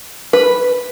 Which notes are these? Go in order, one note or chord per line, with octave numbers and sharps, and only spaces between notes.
B4